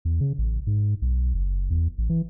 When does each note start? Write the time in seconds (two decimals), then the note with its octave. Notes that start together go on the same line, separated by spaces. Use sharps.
0.05 E2
0.21 C#3
0.38 A1
0.67 G#2
1.02 B1
1.34 F#1
1.70 E2
1.98 A1
2.09 E3